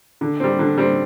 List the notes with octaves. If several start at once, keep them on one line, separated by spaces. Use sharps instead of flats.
D3
G3 C4
D3
G3 C4